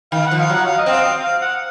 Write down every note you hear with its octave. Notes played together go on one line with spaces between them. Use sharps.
D#3 F5
F#5
F3
F5
F#3 F#5
F5
D#5
C4 F5
F5
F#5